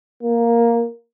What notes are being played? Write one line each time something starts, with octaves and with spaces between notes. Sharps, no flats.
A#3